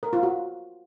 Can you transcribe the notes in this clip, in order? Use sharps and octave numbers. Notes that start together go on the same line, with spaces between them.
A#4
F4
F#4